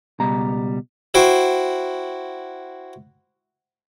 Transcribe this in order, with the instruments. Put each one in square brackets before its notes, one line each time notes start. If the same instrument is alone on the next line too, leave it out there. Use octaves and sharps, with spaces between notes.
[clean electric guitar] C#2 B2 G3 A#5
[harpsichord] E4 F#4 C5 G5